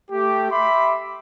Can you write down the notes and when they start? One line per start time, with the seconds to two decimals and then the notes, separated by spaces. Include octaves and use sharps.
0.11 A3 G4
0.51 E5 B5 C6 D6